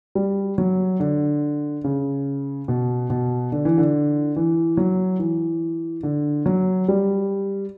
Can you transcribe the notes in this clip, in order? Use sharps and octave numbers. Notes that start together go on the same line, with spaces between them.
G3
F#3
D3
C#3
B2
B2
D3
E3
D3
E3
F#3
E3
D3
F#3
G3